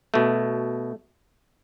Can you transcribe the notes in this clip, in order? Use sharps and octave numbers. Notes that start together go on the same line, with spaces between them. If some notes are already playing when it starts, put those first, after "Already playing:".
B2 A3